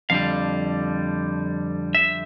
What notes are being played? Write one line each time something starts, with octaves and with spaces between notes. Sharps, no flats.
F2 D3 G3 F5
E5